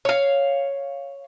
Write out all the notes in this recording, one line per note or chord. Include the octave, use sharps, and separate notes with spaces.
C#5 F5